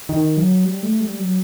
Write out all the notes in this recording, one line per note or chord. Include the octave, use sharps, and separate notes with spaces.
D#3
F#3
G3
A3
G3
F#3